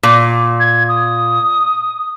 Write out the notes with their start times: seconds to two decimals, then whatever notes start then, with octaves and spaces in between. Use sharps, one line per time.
0.03 A#2
0.60 G#6
0.88 D#6